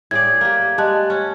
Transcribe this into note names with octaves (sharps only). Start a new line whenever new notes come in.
A2 G#4 D5 G#6
A#3 G4
G#3 G4 A5 F#6
C#4